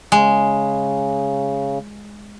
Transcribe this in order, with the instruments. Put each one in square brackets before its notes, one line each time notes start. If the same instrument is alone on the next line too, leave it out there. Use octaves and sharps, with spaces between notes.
[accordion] C#3 [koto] G#3